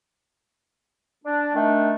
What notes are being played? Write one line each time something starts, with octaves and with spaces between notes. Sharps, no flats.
D4
D#3 A3 D4